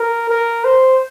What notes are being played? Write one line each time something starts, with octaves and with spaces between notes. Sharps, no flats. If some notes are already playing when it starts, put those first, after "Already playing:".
Already playing: A#4
A#4
C5